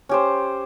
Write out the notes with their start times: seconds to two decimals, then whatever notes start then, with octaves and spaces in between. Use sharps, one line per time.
0.09 C#4 G4 C5